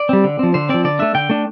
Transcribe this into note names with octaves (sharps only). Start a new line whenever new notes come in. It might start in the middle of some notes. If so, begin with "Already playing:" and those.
Already playing: D5
G3 C4
D3
F3 C4
D3 C5
F3 C4 D5
D3 D5
A3 D4 E5
D3 G5
A3 D4